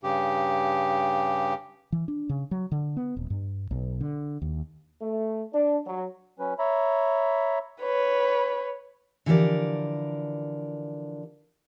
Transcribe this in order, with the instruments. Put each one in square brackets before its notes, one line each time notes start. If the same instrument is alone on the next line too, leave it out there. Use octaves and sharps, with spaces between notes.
[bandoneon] G2 C#3 G4
[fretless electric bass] E3
D4
C#3
F#3
D3
B3
D#1
G2
B1
D3
D#2
[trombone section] A3
D4
F#3
[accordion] F#3 C#4 B4
C#5 E5 A#5 B5
[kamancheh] B4 C#5
[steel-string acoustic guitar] D3 E3 F3 G4 A#4 D5